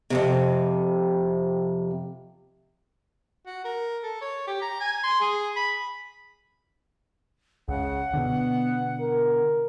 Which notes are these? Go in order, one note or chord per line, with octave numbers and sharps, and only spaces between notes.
F2 G#2 C3
F#4
A#4
A4
C#5
G4
A#5
G#5
C6
G#4
B5
C#2 C#3 F#5
B2 D3 B3
A#4